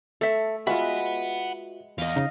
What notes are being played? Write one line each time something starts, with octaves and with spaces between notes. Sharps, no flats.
A3 A4 E5
G#3 F4 F#4 B4 E5 F#5 B5
E2 D#5 F5
C#3 D#4